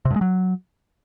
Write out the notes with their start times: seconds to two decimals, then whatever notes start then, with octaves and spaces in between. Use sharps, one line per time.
0.05 C3
0.11 G2
0.16 G#3
0.21 F#3